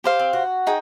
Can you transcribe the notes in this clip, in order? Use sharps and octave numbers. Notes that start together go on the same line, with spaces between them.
G4 C5 F5
C4
F#4
D#4 G#4 G5